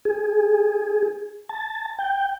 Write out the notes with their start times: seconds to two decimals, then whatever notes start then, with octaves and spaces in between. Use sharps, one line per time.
0.05 G#4
1.49 A5
1.98 G5